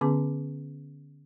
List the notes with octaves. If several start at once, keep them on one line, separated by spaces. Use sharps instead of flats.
D3 B3 C#4 G#4 D6